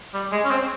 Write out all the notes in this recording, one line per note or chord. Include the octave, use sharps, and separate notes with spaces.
G3
G#3
C#4
C4